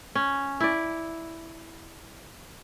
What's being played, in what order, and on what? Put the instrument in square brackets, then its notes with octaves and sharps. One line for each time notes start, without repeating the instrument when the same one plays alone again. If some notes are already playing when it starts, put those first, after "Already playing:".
[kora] C#4
E4 D5